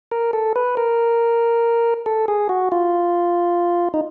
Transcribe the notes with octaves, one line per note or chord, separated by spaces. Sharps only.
A#4
A4
B4
A#4
A4
G#4
F#4
F4
D#4